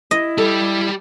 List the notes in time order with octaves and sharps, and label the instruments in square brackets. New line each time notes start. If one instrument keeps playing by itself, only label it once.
[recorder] E4 [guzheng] D#5
[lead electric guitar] G3 G4 [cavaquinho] A4